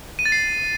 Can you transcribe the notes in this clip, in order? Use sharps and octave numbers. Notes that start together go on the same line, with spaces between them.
D#7
A6
C7